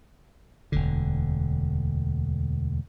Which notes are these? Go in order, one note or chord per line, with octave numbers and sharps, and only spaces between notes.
E1 D2 D3